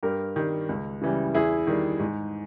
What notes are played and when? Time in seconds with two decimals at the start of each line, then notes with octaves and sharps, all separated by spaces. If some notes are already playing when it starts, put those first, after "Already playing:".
0.03 G2 G4 A#4
0.36 D#3 G3
0.69 C#2
1.01 C#3 E3 G3
1.34 E2 E4 G#4
1.67 D#3 G3
2.00 G#2